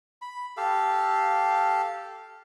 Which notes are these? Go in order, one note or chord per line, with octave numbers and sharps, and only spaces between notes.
B5
G4 A4 F5